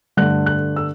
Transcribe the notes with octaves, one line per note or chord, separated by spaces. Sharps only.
G2 D3 A3 F#6
F#6
E6